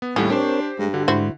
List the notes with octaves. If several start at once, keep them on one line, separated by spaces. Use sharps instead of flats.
B3
D#2 A2 G3 A3 C#4 F#5 B5
C4 D4 G4 A#4 C5 C#5
G2 G#3
D3 F#4
G#2 E4 F#4 C5